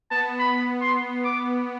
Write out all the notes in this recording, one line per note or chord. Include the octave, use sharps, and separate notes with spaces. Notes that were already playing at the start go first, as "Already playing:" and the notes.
B3 A5
B5
C6
D6